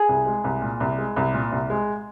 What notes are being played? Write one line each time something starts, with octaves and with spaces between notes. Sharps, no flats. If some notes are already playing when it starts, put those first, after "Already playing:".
Already playing: G#4
C2
G#3
C2
A#2
C2
G#3
C2
A#2
C2
G#3